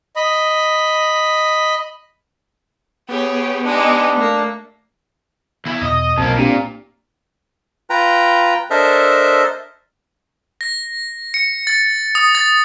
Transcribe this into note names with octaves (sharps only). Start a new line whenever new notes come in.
D#5 B5
B3 G4 G#4 C#5
G#3 D4 D#4 G4
A3 A#3
E2 E4
E2 B2 D#5 D#6
B1 F2 B2 A#3 A5
A#2 C4 D4 G4
F4 B4 G5 A#5
D4 A4 A#4 C5 D#5 E5
A#6
C#7
A6
D#6
A6